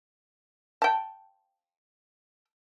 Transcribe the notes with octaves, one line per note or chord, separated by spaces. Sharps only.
G5 A5